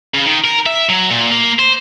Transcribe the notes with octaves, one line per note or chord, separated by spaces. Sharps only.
C#3
D#3
A#4
E5
F#3
A#2
A#3
C5